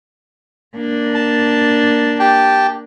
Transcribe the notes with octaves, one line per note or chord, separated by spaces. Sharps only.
A#3 D4
A5
G4 G5 A5